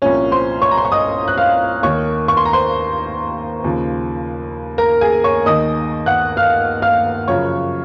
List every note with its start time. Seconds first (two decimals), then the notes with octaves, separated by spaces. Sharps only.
0.02 C2 A#2 F3 C#4 C#5
0.31 C5 C6
0.62 C#5 C#6
0.71 A#5
0.78 C6
0.85 C#6
0.92 D#5 D#6
1.28 F#6
1.38 F5 F6
1.83 D#2 D#3 C#5 C#6
2.28 C#6
2.37 C6
2.45 A#5
2.53 C5 C6
3.64 D#2 C#3 F3
4.78 A#4 A#5
5.01 G#4 G#5
5.24 C#5 C#6
5.46 D#2 D#3 D#5 D#6
6.06 F#5 F#6
6.37 F5 F6
6.82 F5 F6
7.28 F#2 C#3 F3 C#5 C#6